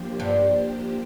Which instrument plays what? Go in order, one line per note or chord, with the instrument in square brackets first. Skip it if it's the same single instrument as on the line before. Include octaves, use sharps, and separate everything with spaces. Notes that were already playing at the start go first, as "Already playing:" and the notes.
Already playing: [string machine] F3 A#3 D4 G4 C5
[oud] G2 G3